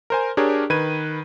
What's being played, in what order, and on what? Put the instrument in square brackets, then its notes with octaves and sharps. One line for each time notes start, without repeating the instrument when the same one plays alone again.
[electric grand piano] A#4 C5 G#5
D4 G4 G#4 A#4 C#5
D#3 B4 G#6 D#7